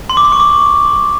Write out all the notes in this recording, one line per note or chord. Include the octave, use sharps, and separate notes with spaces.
C6
D6
C6
C#6
D6